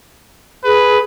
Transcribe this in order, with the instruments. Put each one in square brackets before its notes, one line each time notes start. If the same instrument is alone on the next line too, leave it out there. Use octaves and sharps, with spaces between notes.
[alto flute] G#4 [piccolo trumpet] B4